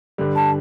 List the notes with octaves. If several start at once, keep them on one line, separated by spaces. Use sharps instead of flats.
G2 D3 G3
A5